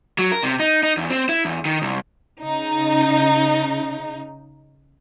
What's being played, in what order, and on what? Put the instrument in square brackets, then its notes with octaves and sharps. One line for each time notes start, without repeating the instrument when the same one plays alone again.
[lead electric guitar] F#3
A#4
C3
D#4
D#4
E2
C4
E4
E2
D#3
C2
[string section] C#3 D#4